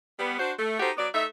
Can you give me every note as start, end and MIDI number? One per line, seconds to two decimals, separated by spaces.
0.19 0.38 55
0.19 0.38 59
0.39 0.52 62
0.39 0.52 66
0.39 0.52 72
0.59 0.78 57
0.80 0.90 63
0.80 0.90 66
0.80 0.90 67
0.80 0.90 69
0.80 0.90 72
0.97 1.08 54
0.97 1.08 59
0.97 1.08 74
1.14 1.25 57
1.14 1.25 63
1.14 1.25 76